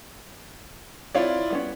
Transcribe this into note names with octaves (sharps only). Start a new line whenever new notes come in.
C4 E4 F4 C#5 D5 F5
G3 B3 C#4